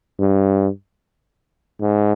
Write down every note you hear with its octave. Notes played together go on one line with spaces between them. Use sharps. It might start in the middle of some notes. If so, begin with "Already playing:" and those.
G2
G#2